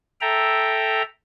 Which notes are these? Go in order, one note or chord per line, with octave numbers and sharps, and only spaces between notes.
A4 E5 G5 A#5